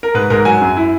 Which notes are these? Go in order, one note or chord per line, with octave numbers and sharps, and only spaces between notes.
A#4
G#2 B4
G#2 A#4
F#3 G#5
F#2
E4